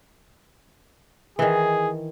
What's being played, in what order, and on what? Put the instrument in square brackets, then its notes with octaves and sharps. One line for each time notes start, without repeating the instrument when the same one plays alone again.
[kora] D#3 E3 [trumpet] G#4